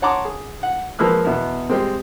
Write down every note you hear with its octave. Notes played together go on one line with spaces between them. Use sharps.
C#5 F#5 A5 A#5 C6 D6
G#4
F#5
F3 G#3 A#3 B4 E6 F#6
E2 B2 B3
G3 G#3 C4